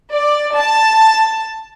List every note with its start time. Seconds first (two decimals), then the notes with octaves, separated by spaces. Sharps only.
0.13 D5
0.55 A5